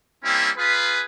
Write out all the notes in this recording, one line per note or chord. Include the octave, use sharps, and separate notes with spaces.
G3 A#3 C4 C#4 E4
F4 G#4 B4